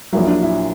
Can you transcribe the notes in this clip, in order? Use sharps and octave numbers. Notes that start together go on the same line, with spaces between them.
A#1 A#2 F#3 E4
D4
E4